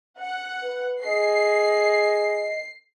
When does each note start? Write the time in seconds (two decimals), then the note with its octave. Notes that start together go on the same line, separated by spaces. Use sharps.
0.19 F#5
0.61 B4
1.04 G#4 D#5 C7